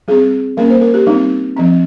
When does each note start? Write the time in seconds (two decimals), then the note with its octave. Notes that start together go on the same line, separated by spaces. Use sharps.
0.08 G3 C4 G#4
0.57 G3 A#3 C#4 A#4
0.70 C5
0.81 A#4
0.94 G4
1.07 G3 C4 D#4
1.57 F3 C4